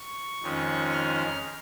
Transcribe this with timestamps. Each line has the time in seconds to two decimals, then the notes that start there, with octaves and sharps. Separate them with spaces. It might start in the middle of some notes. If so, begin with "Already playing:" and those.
Already playing: C#6
0.42 F2 D#3 G#3 C#4
0.92 F6